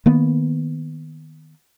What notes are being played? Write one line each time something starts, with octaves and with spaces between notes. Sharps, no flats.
D#3 A#3 B3